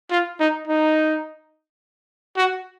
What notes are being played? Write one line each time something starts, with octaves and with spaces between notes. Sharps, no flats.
F4
D#4
D#4
F#4